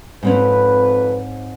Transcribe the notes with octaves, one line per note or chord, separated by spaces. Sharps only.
F2 G#2 C4 C#4 B4